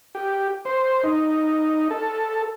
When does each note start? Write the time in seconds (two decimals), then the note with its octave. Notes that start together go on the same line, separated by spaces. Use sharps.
0.15 G4
0.65 C5
1.04 D#4
1.90 A4